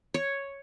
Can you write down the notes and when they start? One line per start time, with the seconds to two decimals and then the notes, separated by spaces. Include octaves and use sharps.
0.14 C#5